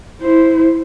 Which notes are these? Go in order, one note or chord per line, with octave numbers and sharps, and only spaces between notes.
E4 C5